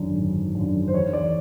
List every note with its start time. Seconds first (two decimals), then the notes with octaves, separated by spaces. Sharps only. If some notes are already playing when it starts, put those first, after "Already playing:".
Already playing: G#1 F#2 D3
0.15 G#1
0.55 F#2 D3
0.88 C5
0.94 E2 C#5
1.13 D5